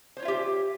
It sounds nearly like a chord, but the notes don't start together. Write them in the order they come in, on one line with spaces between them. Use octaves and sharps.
C5 C#5 F4 E5 G4